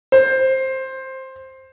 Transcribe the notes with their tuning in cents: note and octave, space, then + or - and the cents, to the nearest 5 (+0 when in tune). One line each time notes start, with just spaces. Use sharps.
C5 +10